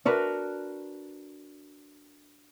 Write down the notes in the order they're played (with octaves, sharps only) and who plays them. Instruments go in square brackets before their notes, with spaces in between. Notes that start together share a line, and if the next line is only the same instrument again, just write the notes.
[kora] D4 F#4 A#4 B4